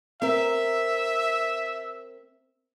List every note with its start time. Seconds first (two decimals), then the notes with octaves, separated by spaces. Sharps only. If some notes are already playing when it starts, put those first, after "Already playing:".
0.22 C4 A#4 E5